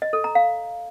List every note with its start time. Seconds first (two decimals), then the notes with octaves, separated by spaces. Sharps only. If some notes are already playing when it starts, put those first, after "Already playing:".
0.02 D#5
0.13 A4
0.24 A#5
0.35 F5